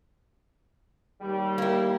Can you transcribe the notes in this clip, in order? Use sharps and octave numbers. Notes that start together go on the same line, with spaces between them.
D#2 G3
A#3 E4